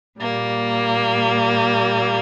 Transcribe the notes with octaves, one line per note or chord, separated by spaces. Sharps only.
A#2 G3 A#3